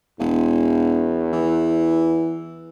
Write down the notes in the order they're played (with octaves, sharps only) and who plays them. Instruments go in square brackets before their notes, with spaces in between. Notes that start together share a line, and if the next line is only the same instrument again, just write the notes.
[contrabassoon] E1 [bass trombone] E2
[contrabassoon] E3